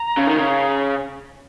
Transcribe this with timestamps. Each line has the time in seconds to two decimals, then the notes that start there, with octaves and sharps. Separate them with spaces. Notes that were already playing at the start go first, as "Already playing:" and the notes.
Already playing: A#5
0.17 C#3
0.27 D#3
0.37 C#3